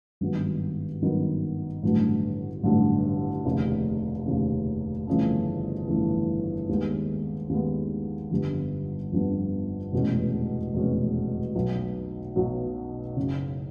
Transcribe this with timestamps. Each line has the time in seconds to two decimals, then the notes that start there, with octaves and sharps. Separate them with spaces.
0.21 G#1 G2 D#3 F#3 B3
1.02 G#1 G2 D#3 F#3 B3
1.83 A1 G2 D3 F#3 A3
2.63 A1 G2 D3 F#3 A3
3.45 F1 D#2 C#3
4.26 F1 D#2 C#3
5.07 G1 F2 C#3 E3 A3
5.88 G1 F2 C#3 E3 A3
6.69 D#2 D#3 G#3 B3
7.49 D#2 D#3 G#3 B3
8.31 G1 F2 D3 G3 B3
9.12 G1 F2 D3 G3 B3
9.92 F1 E2 B2 G#3 C#4
10.74 F1 E2 B2 G#3 C#4
11.55 B1 B2 F#3
12.36 B1 B2 F#3
13.16 F#1 F#2 C#3